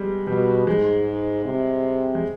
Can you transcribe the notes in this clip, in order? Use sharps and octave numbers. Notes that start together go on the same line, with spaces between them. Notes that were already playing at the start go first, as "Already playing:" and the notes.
Already playing: G3 G#3 B3
B2 G3
G#2 G#3
C3
G#3